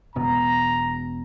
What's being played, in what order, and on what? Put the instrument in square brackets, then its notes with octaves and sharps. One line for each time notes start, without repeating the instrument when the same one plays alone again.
[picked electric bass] E1 B2 [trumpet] A#5